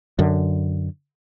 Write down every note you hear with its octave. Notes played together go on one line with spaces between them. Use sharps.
F#2 D3